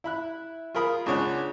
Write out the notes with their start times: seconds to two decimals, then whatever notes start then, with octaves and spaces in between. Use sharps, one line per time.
0.04 E4 B5 F#6
0.75 F4 G#4 A#4 B5 D#6
1.06 C#2 G#3 D4 C#5 F#5 G#5